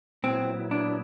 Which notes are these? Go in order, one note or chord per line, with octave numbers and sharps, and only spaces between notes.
A#2 F#3 B3 C4 E4
D4